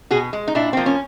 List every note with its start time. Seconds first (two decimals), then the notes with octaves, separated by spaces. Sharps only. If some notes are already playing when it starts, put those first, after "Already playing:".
0.11 B2 F#4 G#4
0.33 G#3
0.48 D#4
0.55 A#2 D4 E4
0.73 F3 A#3 C4
0.86 C#4